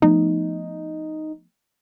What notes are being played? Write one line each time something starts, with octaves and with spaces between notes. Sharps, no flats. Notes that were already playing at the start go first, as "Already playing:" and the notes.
F3 A3 B3 D#4